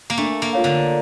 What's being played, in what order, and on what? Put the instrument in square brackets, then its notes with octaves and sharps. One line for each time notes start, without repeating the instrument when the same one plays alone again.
[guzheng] A#3
[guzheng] A3 [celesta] D4
[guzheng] A#3
[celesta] F4 C#5 F5
[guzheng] D3